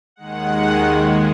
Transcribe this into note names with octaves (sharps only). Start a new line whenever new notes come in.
D#2 D#3 G#3 F#5